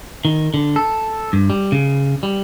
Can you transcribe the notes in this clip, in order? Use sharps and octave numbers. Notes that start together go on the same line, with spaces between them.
D#3
D3
A4
G2
G3
C#3
G3